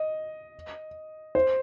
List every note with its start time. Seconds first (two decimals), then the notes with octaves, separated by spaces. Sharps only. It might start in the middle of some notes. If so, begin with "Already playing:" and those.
Already playing: D#5
1.35 C5